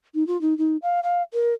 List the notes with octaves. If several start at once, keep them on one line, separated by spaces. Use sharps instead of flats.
D#4
F4
D#4
D#4
F5
F5
A#4